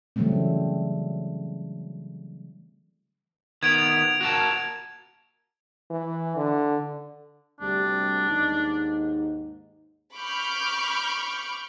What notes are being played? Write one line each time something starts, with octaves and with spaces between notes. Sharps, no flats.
C#3 E3 F#3 G3 A3 C4
D#3 B3 G#6 D7 F7
F#4 A#4 A5
E3
D3
D2 C3 G3 D4
D#2 G#2 D#4
B5 C#6 D6 F6 G6